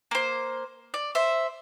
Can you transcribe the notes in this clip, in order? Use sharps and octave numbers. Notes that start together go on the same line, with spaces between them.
A#3 C5
D5
C5 E5